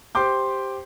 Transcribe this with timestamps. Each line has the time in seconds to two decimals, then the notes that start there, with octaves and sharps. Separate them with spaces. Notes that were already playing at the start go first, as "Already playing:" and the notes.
0.15 G4 C5 G5 C6 D6 G6